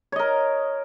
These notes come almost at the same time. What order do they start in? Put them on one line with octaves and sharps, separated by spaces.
C#5 D#5 A#4